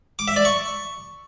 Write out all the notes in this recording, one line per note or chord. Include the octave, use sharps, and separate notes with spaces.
D6
E5
D5
C#6